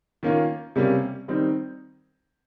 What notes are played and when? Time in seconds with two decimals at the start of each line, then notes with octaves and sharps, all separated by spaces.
0.23 D#3 A#3 C#4 F4
0.76 C3 G3 A#3 C#4
1.28 D#3 G3 C4 D#4